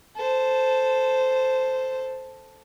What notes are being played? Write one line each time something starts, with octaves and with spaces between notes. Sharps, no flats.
A4 C5